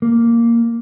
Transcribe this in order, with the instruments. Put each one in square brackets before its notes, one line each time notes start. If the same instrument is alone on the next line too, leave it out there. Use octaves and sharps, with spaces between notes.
[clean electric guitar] A#3